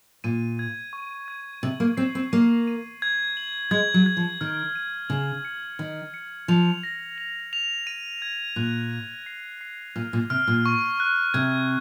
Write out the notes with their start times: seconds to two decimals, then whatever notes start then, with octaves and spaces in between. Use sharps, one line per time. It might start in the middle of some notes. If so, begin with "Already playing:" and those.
0.24 A#2 D#7
0.59 G#6
0.93 C#6
1.28 G#6
1.63 C3 F#7
1.80 A#3
1.97 C4 C7
2.15 C4
2.32 A#3 D#7
2.67 D#7
3.02 G#6
3.37 F#7
3.71 G#3 G#6
3.94 F#3
4.06 G#6
4.17 F3
4.41 D#3 F6
4.75 D#7
5.09 C#3 F#7
5.45 C#7
5.79 D#3 F#7
6.14 C#7
6.48 F3 F7
6.83 A#6
7.18 F7
7.53 F7
7.87 D#7
8.22 G#6
8.56 A#2 F#6
8.91 F7
9.26 C7
9.61 C7
9.96 A#2 F6
10.13 A#2
10.30 C3 F6
10.47 A#2
10.66 C#6
11.00 F#6
11.34 C3 G#6